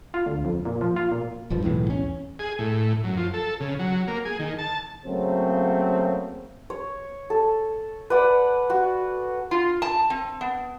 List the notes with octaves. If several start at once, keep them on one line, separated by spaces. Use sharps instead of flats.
F4
D2
F2
A#2
F3
F4
A#2
D#1 G2 F3
B1 E2 A2 E3
E2 C#4
G#4
A2
F#2
F3
A4
C#3
F#3
A#3
G#4
D#3
A5
C#3 F#3 A3 A#3 C4
C#5
A4
B4 D5 F#5
F#4
F4
A5
C4
B3